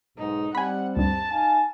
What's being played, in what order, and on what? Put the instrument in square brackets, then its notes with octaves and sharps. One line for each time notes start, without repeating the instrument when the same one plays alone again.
[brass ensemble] B1 G#2 [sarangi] D#4
[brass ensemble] G3 C4 [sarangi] F#5 [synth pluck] G#5 B5
[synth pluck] D2 G2 [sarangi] A5
[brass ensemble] D#4 F5 G#5